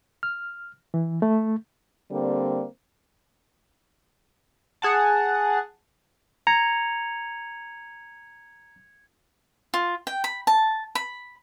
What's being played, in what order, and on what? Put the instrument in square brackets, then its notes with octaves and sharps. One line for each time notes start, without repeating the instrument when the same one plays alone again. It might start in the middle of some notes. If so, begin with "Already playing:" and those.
[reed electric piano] F6
E3
A3
[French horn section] D3 G3 A#3 C4
[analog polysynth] G#4 F#5 A5
[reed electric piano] A#5 [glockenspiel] G#6 C#7 F7
[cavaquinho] F4
G5
B5
A5
B5